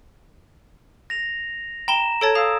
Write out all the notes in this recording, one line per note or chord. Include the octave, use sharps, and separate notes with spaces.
A#6 F7
G5 A#5 B5 E7 G7
A4 C#5 A5 G#6 A6 D7
F5 A#5 D#6 E6